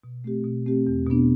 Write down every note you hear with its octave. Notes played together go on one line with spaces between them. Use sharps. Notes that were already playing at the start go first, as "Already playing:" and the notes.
B2
A3 C4 G4
B2
A3 C4 G4
E2
B2 B3 D4